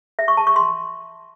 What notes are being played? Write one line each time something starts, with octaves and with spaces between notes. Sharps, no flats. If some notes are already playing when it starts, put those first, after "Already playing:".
E5
C#6
A5
C#6
C6